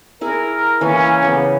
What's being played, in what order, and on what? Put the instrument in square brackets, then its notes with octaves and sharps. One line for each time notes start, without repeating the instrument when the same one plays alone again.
[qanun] E4 G#4 [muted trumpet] A#4
[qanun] E3 A#3 [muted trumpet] C#4
[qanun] C#3 B3